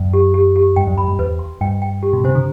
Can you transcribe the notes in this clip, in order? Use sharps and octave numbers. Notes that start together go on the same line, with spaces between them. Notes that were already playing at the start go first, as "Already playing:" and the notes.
Already playing: F#2
G4
G4
G4
G2 G5
F#2
F#2 B5
G2
E2 B4
C6
G2 G5
G5
G4
B2
C3 C5
D3